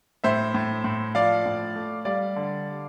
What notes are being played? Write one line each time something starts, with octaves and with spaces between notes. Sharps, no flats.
A2 C5 E5
A2
A2
F3 D5 F5
A2
A3
G3 D5 F5
D3